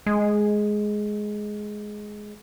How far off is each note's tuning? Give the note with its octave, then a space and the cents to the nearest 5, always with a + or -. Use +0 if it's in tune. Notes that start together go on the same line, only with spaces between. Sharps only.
G#3 +10